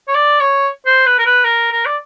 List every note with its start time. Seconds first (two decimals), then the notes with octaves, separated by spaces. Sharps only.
0.08 C#5
0.15 D5
0.40 C#5
0.86 C5
1.06 B4
1.19 A#4
1.26 B4
1.45 A#4
1.72 A#4
1.86 D5